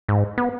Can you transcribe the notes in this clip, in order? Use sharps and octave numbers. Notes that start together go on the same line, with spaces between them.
G#2
B3